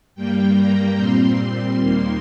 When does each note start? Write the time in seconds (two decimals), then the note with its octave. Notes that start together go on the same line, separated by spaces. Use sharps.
0.15 G2 G3 A#3 G5
0.56 A#5
0.96 A#2 G3 C4 C6
1.78 D#2 D#3 A#3